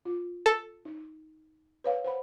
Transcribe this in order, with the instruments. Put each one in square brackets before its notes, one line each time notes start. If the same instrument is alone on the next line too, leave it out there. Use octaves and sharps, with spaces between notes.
[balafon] F4
[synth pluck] A4
[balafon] D#4
B4 C#5 F5
C5 F#5 B5